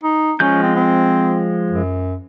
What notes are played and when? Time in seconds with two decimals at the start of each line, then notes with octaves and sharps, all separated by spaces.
0.03 D#4
0.40 F3 G#3 C#4 G6
0.63 C4
0.75 C4
1.71 F#2